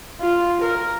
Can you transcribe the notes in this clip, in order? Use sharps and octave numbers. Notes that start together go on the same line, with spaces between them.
F4
A#4